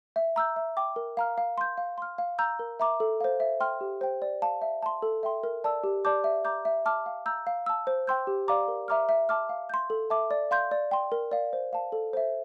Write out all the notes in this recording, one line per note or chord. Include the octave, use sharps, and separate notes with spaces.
E5
A#5 E6 G6
E5
G5 D6
A#4
F5 A#5 F6
F5
C6 G6
F5
C6 F6
F5
A#5 E6 G6
A#4
E5 A#5 D6
A4
C5 F5
E5
G5 C6 F6
G4
C5 G5
D5
F5 A5
E5
A5 C6
A4
E5 G5 C6
A#4
D5 A5 E6
G4
D5 A5 D6 G6
E5
A#5 D6 G6
E5
A5 D6 F6
F5
A#5 E6 G6
F5
A5 E6
C5
G5 C6 E6 G6
G4
D5 F5 A#5 D6
A#4
E5 A#5 D6 F6
E5
A5 D6 F6
F5
C6 G6
A4
E5 A5 D6
D5
F5 C6 G6
D5
G5 C6
A#4
D5 F5
C5
F5 A5
A4
C5 E5